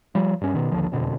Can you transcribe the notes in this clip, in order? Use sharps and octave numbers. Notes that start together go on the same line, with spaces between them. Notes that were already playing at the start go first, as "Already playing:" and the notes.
F3 G3
G2 C#4
B2 D#3
A#1 D#2 D3 F3
E1 F2 B2 D3